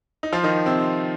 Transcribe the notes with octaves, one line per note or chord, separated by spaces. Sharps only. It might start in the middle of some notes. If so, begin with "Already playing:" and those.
D#4
F3 F4
D#3 D#4
C3 C4